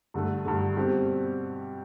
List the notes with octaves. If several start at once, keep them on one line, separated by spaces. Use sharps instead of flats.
G2 D3 A3
G2 D3 A3
B2 G3 C4 G4